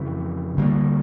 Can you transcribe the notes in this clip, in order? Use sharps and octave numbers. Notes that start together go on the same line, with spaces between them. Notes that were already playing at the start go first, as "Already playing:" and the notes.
Already playing: F2 C#3 E3
D2 D3 G3 A#3